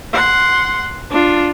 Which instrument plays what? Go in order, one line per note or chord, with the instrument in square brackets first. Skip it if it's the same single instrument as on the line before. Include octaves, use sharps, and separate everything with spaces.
[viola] F#5 C6
D4 F4